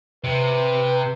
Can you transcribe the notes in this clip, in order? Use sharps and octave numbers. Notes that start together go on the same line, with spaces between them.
C3 B4